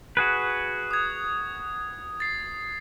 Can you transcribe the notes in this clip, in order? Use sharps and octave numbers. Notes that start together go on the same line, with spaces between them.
F#4 G#4 B4
D#6 G#6
A6 C7